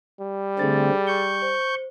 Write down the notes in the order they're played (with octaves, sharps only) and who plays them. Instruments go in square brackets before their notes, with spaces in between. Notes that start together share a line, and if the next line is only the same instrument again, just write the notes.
[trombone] G3
[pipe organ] D3 A3 C4 [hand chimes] G#4 A6
[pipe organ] C#6 G6
[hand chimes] C5